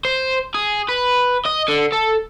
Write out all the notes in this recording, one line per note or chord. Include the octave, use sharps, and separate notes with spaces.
C5
G#4
B4
D#5
D3
A4